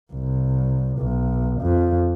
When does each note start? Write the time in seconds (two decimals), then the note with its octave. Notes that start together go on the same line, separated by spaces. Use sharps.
0.13 C2
0.98 B1
1.61 F2